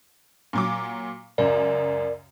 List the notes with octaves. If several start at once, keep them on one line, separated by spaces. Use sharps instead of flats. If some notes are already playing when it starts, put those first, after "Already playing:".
A#2 F#3 D6
C#2 F#2 A#4 D5